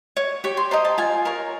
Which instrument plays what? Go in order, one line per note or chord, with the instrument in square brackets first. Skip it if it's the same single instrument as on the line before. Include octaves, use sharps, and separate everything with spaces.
[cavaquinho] C#5
G4 C#6
C6
C5 D#5 A#5
A5
F4 G#5
A#4 C#5